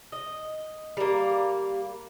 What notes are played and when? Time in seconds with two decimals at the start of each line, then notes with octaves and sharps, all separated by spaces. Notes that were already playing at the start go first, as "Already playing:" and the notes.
0.12 D#5
0.97 G3 A#3